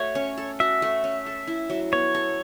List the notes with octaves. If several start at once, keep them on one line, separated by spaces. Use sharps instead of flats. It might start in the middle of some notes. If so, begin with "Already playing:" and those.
Already playing: A3 F#4 C#5
C#4
A4
F#4 E5
A3
C#4
A4
E4
F#3
B3 C#5
A4